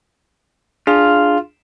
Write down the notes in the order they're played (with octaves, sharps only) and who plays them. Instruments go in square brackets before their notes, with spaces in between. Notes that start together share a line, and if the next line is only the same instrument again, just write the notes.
[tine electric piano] D4 G#4 [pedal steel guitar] F4